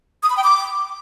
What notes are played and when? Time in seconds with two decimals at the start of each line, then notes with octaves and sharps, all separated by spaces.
0.23 D#6
0.30 B5
0.37 G5
0.44 D6